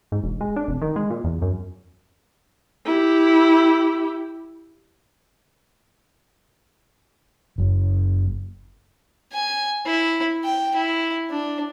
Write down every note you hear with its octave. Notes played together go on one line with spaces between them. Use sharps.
G#2
E1
G#3
D4
F1
D#3
G#3
A#2
E2
F#2
E4 G4
F#1
G#5
E4
G5
E4
D4